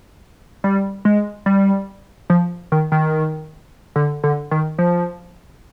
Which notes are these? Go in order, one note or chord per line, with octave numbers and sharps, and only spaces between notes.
G3
G#3
G3
F3
D#3
D#3
D3
D3
D#3
F3